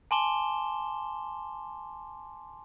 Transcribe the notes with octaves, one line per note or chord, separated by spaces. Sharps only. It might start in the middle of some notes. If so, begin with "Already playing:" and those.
G#5 A5 C6 D6 E7 G7